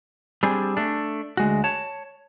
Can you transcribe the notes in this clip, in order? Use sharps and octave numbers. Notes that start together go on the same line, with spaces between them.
G3 C4 D4 G#4
A3 D4
D2 G#3 F#4
C#5 A5